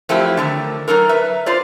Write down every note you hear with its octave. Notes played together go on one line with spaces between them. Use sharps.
F3 F#3 A3 C4 E4 G4
D3 D#3 A3
F#3 D#4 A4 A#4
B4 E5
F4 C5 D5